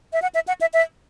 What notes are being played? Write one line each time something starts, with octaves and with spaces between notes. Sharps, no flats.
E5
F#5
E5
F#5
E5
E5